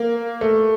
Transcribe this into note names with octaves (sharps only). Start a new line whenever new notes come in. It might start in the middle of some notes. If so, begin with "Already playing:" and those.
Already playing: A#3
A3